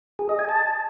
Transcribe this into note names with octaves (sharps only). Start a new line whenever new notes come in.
G#4
D#5
G#5
A5